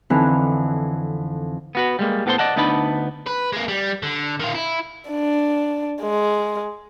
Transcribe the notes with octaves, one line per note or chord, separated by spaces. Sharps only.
F2 D3 E3 D#4 E4 F#6
B3 F#4 B4
G3 G#3 A#3
A2 B3 G4 A4 C5 C6
D5 D#5 F#5 A5
D2 B3 D4 D#4 A5 B5
B4
G#3 A#3
G3
D3
D#3 F4
E4
D4
G#3